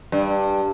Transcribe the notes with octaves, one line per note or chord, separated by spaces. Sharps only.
G2